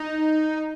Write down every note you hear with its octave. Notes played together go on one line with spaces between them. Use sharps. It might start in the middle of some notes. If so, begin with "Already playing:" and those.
Already playing: D#4